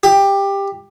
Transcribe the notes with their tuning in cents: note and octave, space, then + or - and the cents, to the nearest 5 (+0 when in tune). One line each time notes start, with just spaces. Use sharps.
G4 +15